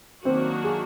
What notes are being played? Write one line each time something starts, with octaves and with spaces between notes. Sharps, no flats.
D#3 F#3 A#3 C4 D4 F#4
G#4